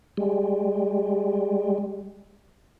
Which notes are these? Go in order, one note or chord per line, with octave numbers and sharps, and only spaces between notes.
G3 G#3